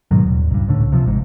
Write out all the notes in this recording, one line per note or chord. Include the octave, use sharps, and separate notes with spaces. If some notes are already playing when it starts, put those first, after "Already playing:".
G#2 B2 D#3 F#3
D#1
C#2 G2
C#2 A2 D3
C3 F3
G#1 G#2